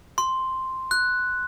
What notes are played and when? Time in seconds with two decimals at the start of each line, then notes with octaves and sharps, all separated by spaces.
0.18 C6
0.91 F#6